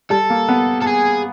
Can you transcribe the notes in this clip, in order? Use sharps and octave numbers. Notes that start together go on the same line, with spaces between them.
G3 A4
A#3
B3
A4
G#4